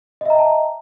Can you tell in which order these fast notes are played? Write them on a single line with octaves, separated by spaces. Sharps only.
D#5 E5 A#5 G5 A5